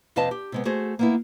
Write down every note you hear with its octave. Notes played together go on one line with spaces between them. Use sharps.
F2 C3 B4 D#5 F5 A5
G4
C3 G#3 B3
A3 F#4 G#4 C5
A#3 B3 E4